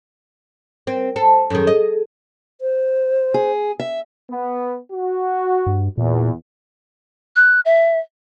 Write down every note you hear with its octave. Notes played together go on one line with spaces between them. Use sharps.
C4 A#4
A4 C5
F#2 D#3 G#4 A4
D#5
C5
G#4
E5
B3
F#4
G2
E2 A#2
F#6
E5